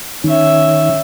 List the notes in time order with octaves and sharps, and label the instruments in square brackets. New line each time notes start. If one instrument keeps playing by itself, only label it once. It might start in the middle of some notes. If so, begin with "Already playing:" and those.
[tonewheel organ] D#3 [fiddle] C#4 E5